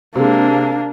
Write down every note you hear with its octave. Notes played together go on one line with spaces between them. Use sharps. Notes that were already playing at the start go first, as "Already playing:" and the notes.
C3 G#3 A#3 D4